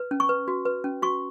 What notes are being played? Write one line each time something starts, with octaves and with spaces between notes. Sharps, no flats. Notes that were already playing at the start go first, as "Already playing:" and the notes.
Already playing: B4
C#4
C#6
B4
F#4
B4
C#4
F#4 C#6